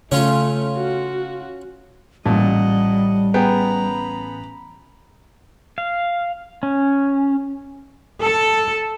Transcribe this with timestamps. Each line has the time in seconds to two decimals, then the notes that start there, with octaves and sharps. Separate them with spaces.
0.12 C#3 A3 C#4 F4
0.78 F#4
2.26 A1 A#2 G3 D#5 F#5 A5
3.34 B3 G#4 G5 A#5 B5
5.78 F5
6.63 C#4
8.23 A4